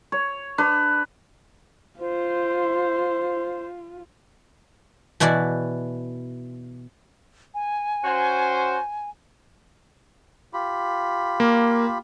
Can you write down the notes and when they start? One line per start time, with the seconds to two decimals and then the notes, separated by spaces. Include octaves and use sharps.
0.12 C#5
0.58 D4 B4
2.00 F4 C5
5.20 B2 E3 E4 F#4 D5
7.54 G#5
8.04 C#4 F#4 C5
10.53 F4 G4 B5
11.40 A#3